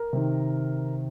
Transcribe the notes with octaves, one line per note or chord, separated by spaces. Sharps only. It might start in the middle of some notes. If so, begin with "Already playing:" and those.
Already playing: A#4
C3 D#3